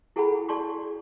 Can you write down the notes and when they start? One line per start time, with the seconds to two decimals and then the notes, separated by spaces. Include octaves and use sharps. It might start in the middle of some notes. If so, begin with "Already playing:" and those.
0.16 E4 G#4 A4 F#5 G5 B5
0.48 G#4 D5 A5 C6 C#6